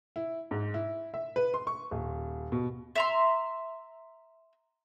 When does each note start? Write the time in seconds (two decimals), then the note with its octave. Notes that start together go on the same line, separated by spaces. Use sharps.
0.16 E4
0.51 G#2
0.74 E4
1.14 E5
1.36 B4
1.54 C6
1.67 C#6
1.91 D#1
2.52 B2
2.96 E5 A#5 C6